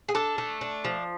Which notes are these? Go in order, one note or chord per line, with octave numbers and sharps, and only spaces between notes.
G#4
D4 A4
A3
D4
F3